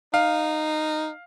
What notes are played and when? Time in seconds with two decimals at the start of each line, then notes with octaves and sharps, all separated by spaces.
0.14 D#4 F5